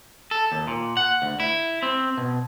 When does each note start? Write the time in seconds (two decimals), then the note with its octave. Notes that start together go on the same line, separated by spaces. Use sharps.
0.31 A4
0.52 D#2
0.67 A#2
0.97 F#5
1.22 D2
1.40 E4
1.83 C4
2.17 B2